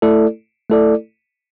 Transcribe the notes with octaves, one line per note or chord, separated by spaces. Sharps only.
A3 E4 A4 D5
A3 E4 A4 D5